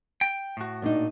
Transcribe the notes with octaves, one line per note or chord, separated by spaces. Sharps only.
G5
A2 F#4
A#2 D4 D#4